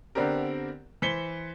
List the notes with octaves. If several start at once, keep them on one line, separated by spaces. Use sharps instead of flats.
D3 B3 C4 D4 G4 A#4
E3 C5 B6 C#7 G7